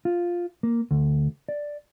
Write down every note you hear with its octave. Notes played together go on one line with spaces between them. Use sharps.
F4
A#3
D2
D5